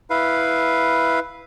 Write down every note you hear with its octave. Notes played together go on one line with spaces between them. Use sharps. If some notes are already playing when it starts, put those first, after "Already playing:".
E4 B4 F5